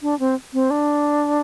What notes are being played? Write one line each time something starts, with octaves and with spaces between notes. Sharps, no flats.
D4
C4
C4
D4